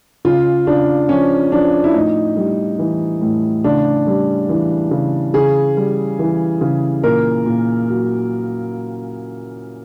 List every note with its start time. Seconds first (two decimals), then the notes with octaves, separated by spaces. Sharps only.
0.25 C#3 F4
0.67 C#3 D4
1.09 F3 C#4
1.52 F3 D4
1.84 E4
1.94 A2 D#4
2.36 G3
2.79 E3
3.22 A2
3.64 C#3 D4
4.07 G3
4.49 E3
4.91 C#3
5.34 C#3 G#4
5.77 G3
6.19 E3
6.61 C#3
7.04 A#2 A#4
7.46 A#2
7.89 F#3